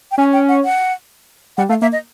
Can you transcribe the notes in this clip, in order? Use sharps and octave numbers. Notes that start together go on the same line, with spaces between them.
G5
C#4 G#5
G5
F#5
F#5
G3 F#5
A3 F5
A#3 E5
D#5